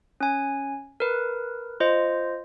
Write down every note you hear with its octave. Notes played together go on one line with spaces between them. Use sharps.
C#4 G#5
A#4 B4
F4 C5 D#5